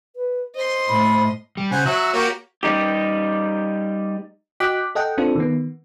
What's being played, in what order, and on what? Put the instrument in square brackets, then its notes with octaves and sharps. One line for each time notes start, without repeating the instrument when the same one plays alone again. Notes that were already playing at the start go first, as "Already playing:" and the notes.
[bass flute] B4
[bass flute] C5 [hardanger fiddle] D#5 C6
[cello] A2 [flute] B5
[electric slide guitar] G3
[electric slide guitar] C#3 [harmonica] C5 F#5 G#5
[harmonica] F#3 E5 [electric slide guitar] F#4
[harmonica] A#3 G4 C#5
[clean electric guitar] G3 D#4 G4
[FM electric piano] F#4 D#5 G5 D6 F#6 B6
A4 D#5 F#5 G5
C4 D4 F4 A4
D#3 B3